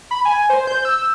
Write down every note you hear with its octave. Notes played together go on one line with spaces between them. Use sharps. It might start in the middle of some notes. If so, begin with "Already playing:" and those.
B5
G#5
C5
G6
E6